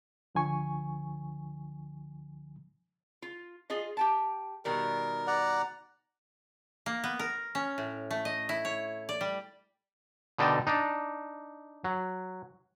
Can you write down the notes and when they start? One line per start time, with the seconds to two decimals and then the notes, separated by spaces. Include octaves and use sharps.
0.35 C#2 D3 F3 G#5 C#6
3.22 F4
3.70 F4 G#4 D#5
3.97 G4 G5 A5
4.65 B2 D#3 G3 A#4
5.27 D5 F#5 A#5
6.86 A#3
7.04 B3
7.19 A#4
7.55 C#4
7.78 A2
8.11 A3
8.25 D#5
8.49 E4
8.65 C#5
9.09 D5
9.21 G3
10.38 B2 D3 D#4 D5 G5 A5
10.67 D4 D#4
11.84 F#3